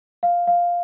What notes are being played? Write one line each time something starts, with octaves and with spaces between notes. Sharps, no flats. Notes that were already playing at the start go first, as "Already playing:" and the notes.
F5
F5